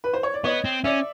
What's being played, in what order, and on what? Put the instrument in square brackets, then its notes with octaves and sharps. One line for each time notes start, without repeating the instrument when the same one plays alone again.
[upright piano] B4
C5
C#5
D5
[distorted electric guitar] B3 [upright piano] C#5 D#5
[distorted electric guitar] C4
[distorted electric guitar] C#4 [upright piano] D5 E5